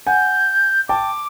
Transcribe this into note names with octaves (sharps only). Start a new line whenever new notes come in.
F#5 G#5 G6
G5 A5 D6